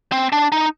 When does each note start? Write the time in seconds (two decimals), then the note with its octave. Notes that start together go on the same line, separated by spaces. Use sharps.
0.12 C4
0.32 D4
0.52 D#4